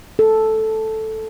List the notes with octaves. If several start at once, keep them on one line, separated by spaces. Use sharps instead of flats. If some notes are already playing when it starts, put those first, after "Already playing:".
A4